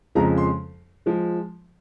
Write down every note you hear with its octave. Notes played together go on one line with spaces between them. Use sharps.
F2 C#3 F3 G#3 A#5
C6
F3 G#3